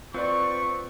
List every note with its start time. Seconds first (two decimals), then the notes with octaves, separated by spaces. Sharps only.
0.14 C4 F4 B4 D5 C#6